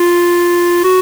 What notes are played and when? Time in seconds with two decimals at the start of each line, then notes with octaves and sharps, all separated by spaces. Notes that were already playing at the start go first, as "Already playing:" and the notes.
Already playing: F4
0.84 F#4